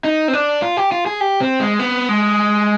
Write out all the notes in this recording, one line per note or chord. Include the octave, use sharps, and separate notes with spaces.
D#4
C4
D4
F4
G4
F4
G#4
G4
C4
G#3
B3
G#3